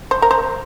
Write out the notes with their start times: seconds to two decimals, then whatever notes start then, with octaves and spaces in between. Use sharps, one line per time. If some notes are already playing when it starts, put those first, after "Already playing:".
0.11 C5
0.22 A#4
0.31 C5